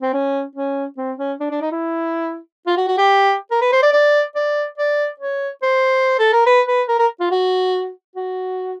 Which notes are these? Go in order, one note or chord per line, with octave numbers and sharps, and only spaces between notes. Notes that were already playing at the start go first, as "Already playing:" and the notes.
C4
C#4
C#4
C4
C#4
D4
D4
D#4
E4
F4
F#4
F#4
G4
A#4
B4
C5
D5
D5
D5
D5
C#5
C5
A4
A#4
B4
B4
A#4
A#4
F4
F#4
F#4